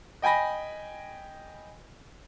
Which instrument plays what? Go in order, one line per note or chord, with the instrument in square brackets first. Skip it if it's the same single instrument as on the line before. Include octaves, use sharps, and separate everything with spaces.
[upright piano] D#5 G5 G#5 B5 A#6